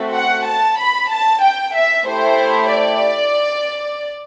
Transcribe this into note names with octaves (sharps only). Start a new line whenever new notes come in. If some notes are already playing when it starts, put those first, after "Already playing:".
Already playing: A3 C4 F#4 A4
F#5
A5
B5
A5
G5
E5
A3 E4 G4 C5
D5